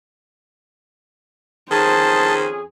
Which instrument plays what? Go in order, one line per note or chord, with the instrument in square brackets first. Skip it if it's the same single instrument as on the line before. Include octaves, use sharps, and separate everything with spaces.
[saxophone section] F2 C#4 G#4 [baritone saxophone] D#3 [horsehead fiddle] C5 [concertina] A5